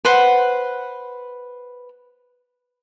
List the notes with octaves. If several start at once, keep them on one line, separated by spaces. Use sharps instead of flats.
B4 C5 F#5